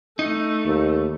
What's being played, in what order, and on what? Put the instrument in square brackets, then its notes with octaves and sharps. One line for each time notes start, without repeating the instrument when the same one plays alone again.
[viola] A3 [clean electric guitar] D#4
[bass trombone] D#2